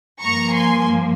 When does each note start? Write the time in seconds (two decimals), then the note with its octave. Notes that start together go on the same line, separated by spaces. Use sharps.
0.21 G2 F3 A#3 A#5 C#6
0.54 G#5 C6